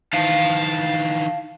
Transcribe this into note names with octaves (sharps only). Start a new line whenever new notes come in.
D#3 E3 F5 A5